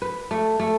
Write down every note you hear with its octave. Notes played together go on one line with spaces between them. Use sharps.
B4
A3
A3